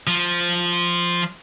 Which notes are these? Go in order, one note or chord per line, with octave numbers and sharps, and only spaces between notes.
F3